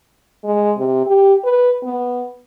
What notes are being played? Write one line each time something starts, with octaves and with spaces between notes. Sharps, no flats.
G#3
C3
G4
B4
B3